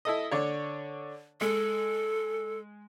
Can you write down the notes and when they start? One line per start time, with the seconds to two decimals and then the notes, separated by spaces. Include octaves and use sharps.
0.05 E4 A4 D#5
0.31 D3 D4 C#5
1.41 G#3 A4